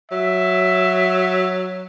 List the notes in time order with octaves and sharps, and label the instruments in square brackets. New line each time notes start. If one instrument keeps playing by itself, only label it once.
[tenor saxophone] F#3 [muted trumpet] E5